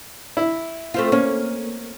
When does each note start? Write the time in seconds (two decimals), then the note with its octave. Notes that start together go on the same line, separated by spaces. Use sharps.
0.37 E4
0.94 A3 C4 F4
1.12 A#3 C#4